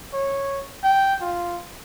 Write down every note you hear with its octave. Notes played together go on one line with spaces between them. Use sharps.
C#5
G5
F4